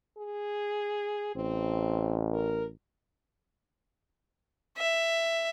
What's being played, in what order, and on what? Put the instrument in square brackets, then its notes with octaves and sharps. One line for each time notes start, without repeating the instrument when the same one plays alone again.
[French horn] G#4
[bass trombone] A1 [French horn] C4
[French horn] A#4
[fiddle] E5